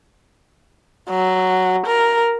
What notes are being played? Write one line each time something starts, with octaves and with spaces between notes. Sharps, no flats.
F#3
A#4